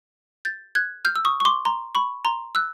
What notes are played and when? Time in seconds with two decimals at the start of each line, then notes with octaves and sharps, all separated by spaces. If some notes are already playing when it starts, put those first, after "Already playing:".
0.45 G6 A6
0.75 F#6 G#6
1.05 F6 G6
1.16 E6
1.25 C#6 D#6
1.40 C#6
1.45 C6 D6
1.65 A#5 C6
1.95 B5 C#6
2.25 A#5 C6
2.55 E6 F#6